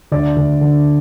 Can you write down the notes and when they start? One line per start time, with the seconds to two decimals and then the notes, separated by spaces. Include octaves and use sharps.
0.12 D2 D5
0.37 D2
0.61 D3